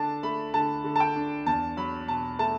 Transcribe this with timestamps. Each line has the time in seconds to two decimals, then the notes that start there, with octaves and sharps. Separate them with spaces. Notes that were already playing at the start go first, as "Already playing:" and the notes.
Already playing: D3 D4 A5
0.23 A3 B5
0.54 D3 A5
0.84 D3
0.96 A5
1.00 G5
1.16 D4
1.46 E2 A5
1.77 F#3 B5
2.08 B2 A5
2.39 A3 A5